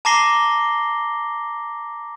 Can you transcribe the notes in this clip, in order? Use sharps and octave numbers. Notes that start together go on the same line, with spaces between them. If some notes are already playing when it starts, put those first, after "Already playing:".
A5 A#5 D6 A#6 C7 G7